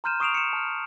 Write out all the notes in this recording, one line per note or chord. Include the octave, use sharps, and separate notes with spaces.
A#5 C6 F6 G6 D#7 E7
C#6 D#6 C7 D7 E7 F7
C#7 E7
A5 F6